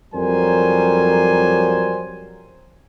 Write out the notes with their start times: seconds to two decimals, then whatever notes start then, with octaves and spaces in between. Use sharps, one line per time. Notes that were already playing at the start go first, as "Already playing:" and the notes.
0.14 F2 F#3 G3 A#4 C5 G#5